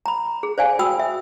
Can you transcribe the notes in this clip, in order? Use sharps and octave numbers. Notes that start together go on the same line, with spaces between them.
A#5 B5
G#4
C5 D5 F5 G#5
F#4 G5 B5 D#6 E6
E5